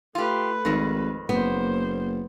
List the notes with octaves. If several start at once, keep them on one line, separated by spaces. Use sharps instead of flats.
A3 F4 G4 B4
G#1 F2 D#3
F#1 A#3 B3 C5